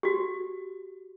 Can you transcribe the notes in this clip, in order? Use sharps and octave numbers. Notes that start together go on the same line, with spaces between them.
F#4 G4